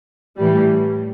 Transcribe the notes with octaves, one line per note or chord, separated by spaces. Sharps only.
A2 E3 G3